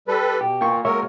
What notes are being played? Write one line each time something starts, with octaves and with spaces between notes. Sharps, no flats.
G3 A4 B4
B2 G4
A#3 F4 A#4 G5 C#6
G#3 A#3 F#4 A#4 C#5 E5 C#6